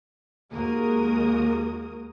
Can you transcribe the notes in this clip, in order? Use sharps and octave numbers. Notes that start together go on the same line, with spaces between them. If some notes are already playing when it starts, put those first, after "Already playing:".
D#2 G#3 A#3 F#4 A#4 D#6